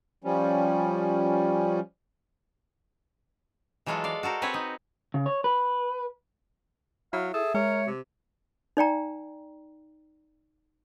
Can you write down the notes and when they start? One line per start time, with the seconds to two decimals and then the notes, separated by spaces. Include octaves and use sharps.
0.24 F3 G3 C#4
3.86 E3 F#3 G#3 F4 F#4 A4
4.04 D5 F5
4.23 F#4 A4 A#4 C5
4.42 C4 B4 C#5 F#5 G#5
4.53 D#4 D#5
5.14 C#3
5.26 C#5
5.44 B4
7.13 F#3 E4 F5
7.34 G#4 A4 E5
7.54 G#3 A#4 C#5
7.87 C3
8.77 D#4 D5 G5 A#5